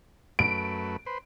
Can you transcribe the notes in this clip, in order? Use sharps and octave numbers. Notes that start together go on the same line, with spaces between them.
F#2 A3 B4 D7
B4 C5